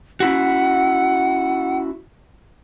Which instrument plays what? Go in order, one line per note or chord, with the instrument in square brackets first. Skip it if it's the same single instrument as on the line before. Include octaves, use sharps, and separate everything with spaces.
[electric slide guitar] C#4 E4 F#4 [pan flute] F#5